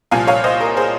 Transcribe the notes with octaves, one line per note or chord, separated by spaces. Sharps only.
C2 A#2 F3 F5 G#5
C#5 F5
C5 D#5
A#4
G#4 C5